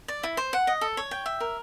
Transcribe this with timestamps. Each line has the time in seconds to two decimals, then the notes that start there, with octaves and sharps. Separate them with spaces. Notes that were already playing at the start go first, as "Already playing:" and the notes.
0.08 D5
0.23 E4
0.37 C5
0.53 F#5
0.67 D#5
0.81 A4
0.97 C#5
1.11 G5
1.26 E5
1.40 A#4